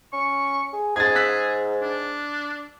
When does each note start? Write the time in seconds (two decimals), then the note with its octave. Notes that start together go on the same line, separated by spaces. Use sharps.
0.13 C#4 C#6
0.73 G#4
0.96 G#2 G#4 G#6 A6
1.15 E6 F#6 B6
1.81 D4